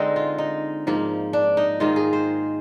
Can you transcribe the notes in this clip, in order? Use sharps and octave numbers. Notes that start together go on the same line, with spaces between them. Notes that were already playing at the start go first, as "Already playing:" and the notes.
Already playing: D3 G#3 C4 D#4
F4
D#4
G#2 F3 A#3
D4
D#4
G#2 D#3 A#3 F4
G#4
C5